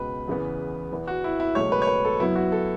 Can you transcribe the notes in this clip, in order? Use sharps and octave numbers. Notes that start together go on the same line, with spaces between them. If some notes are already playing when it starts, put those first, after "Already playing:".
Already playing: C#2 B2 B3 B4
E2 C#3 E3 B3
E2 E3 B3
F#4
E4
E4
C#2 B2 F#3 A3 C#5
B4
C#5
B4
A4
F#2 F#3 B3 E4
F#4
A4